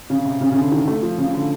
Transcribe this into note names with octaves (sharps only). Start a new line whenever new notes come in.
C#3
C3
C#3
C#3
D3
D#3
A3
F3
C#3
D3